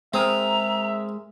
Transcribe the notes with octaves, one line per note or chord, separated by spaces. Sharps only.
G#3 C4 G#4 A#4 E5 A#5